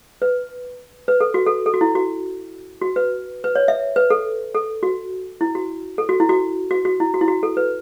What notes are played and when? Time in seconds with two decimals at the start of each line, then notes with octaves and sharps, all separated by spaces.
0.22 B4
1.08 B4
1.21 A4
1.34 F#4
1.46 A4
1.66 A4
1.74 F#4
1.81 E4
1.95 F#4
2.82 F#4
2.96 B4
3.44 B4
3.55 C#5
3.68 E5
3.96 B4
4.10 A4
4.55 A4
4.83 F#4
5.41 E4
5.55 F#4
5.98 A4
6.09 F#4
6.20 E4
6.29 F#4
6.71 F#4
6.85 F#4
7.00 E4
7.14 F#4
7.21 E4
7.28 F#4
7.43 A4
7.57 B4